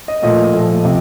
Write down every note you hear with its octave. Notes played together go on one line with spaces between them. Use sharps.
D#5
A#2 F3 A3 D#5
A#2 F3 A3
C3 F3